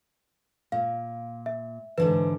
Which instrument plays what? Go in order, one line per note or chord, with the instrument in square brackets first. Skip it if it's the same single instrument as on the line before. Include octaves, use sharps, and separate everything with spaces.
[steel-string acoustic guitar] A#2 [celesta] F5
[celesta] E5
[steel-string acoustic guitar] G#2 D3 E3 [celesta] B4